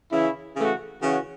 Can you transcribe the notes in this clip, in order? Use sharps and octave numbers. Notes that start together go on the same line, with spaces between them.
C#3 E3 C#4 E4
C#3 E3 A3 F#4
C#3 E3 C#4 F#4